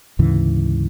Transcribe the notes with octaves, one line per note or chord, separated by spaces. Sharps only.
D2 G#2 C#3 E3